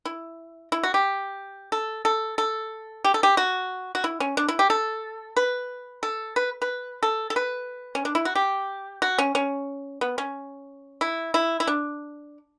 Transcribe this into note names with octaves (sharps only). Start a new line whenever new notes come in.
E4
E4
F#4
G4
A4
A4
A4
G4
A4
G4
F#4
F#4
E4
C#4
D4
E4
G4
A4
B4
A4
B4
B4
A4
A4
B4
C#4
D4
E4
F#4
G4
F#4
C#4
C#4
B3
C#4
E4
E4
E4
D4